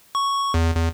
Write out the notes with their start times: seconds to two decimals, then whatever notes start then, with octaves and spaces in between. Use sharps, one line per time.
0.15 C#6
0.54 E2
0.76 E2